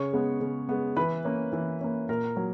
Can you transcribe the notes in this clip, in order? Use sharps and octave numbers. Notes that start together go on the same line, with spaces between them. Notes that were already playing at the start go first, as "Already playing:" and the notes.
Already playing: C#3 C#5 C#6
G#3 B3
C#3
G#3 B3
E3 B4 B5
A#3 C#4
E3
A#3 C#4
A#2 A#4 A#5
F#3 A#3